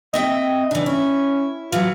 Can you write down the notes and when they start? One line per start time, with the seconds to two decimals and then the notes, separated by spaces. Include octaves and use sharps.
0.14 C4 D#5 E5 G5
0.71 C#3 E3 D4
0.86 C#4 E4
1.72 E3 F#3 F4